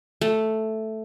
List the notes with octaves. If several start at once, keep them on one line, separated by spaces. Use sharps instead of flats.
A3